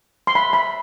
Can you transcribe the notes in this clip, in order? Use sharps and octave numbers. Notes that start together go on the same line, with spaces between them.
C6
B5
B5